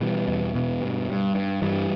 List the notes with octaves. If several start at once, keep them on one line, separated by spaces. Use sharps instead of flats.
B2 E3 G3
E2
B2
G2
G2
G2
G2 E3 G3